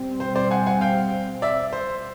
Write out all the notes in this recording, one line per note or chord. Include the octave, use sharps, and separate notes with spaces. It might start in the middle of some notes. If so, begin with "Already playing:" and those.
Already playing: B2 G3 C4
C5
C5 D5
F#5 G#5
F#5 G#5
F5 G5
D5 E5
C5